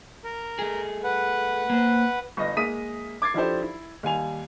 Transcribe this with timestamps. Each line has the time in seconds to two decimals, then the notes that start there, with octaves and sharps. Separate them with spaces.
0.24 A#4
0.59 A3 G#4
1.04 B4 F#5
1.70 A#3 C5
2.37 G1 D#5 A#6
2.56 G#3 A#3 E5 D#6 B6 D#7
3.22 D6 G#6 A6 C7
3.34 F3 D4 E4 G4 A4 C5
3.62 E4
4.03 D#2 G3 G#5 F7